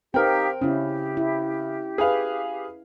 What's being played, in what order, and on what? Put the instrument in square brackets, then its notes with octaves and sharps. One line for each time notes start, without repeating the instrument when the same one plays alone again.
[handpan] C4 [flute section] D#4 G4 F5 [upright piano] A#4 G5
[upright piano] C#3 [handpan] C#4 E4 [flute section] G4
[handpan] E4
[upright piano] G#4 B4 F5